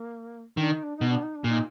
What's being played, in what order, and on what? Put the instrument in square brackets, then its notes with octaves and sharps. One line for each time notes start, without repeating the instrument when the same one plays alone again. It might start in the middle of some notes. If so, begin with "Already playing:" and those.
Already playing: [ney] A#3
[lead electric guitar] D#3 [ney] D4
[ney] D#4
D4
[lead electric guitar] B2 [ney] D#4
[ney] D4
D#4
D4
[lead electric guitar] A#2 [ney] D#4